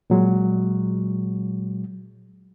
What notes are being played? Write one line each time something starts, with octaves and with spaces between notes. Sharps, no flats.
A#2 F#3 G#3